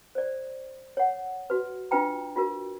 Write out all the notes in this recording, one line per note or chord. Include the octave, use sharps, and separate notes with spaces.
C5 D5
C#5 F#5
F#4 B4
D4 F4 B4 G5 A#5
F4 F#4 A#4